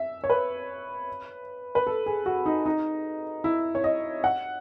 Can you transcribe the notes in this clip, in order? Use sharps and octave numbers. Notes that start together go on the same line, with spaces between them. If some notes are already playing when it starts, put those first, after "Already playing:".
Already playing: E5
C#5
B4
B4
A4
G#4
F#4
D#4
D#4
E4
C#5
D#5
F#5